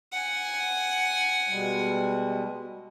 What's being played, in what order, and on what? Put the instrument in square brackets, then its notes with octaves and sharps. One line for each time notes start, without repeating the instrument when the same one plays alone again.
[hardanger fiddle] F#5 G#5
[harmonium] B2 G3 G#3